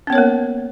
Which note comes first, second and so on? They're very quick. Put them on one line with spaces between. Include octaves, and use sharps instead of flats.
C#4 B3 C#5 A#4 A#3